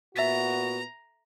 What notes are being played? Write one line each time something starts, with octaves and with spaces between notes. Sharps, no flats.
A#2 B3 F#4 E5 A#5 A6 B6